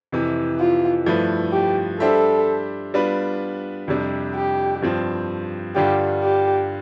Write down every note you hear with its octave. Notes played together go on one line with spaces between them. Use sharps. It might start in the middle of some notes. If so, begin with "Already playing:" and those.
F2 C3 E3
F4
G2 F3 A3 E4 B4
G4
G3 D4 G4 A4 C5 E5
G3 B3 D4 F4 B4
F2 C3 G3 D4
G4
G2 F3 C4
G2 D3 G3 D4 F4 G4
G4